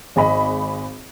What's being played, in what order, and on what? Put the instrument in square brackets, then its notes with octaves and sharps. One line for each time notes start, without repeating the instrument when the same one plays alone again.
[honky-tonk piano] G#1 G#4 D#5 B5